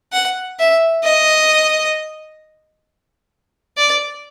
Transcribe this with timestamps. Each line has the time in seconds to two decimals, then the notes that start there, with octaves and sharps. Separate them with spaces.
0.13 F#5
0.59 E5
1.04 D#5
3.77 D5